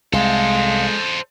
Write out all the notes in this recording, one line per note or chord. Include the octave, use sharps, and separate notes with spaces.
C2 G#3 A4 C5 F5